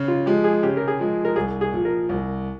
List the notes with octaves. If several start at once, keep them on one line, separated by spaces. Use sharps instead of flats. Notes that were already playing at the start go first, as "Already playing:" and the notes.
Already playing: C#3
F4
F3 G#3 G4
G#4
C#3 G4
A#4
G#4
F3 G#3
A#4
C2 G#4
G#4
A#2 F3
A#4
C2